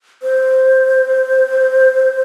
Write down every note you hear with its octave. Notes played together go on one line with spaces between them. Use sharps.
C5